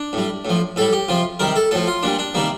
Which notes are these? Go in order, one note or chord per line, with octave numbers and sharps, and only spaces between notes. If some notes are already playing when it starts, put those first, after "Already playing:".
Already playing: D4
A2 G3
A2 F3
A2 G3 A4
G4
C3 F3 F4
C3 D#3 G3 A#4
A4
A2 F3 A4
F4
A#2 G3 D4
D4
C3 D#3 G3 A#3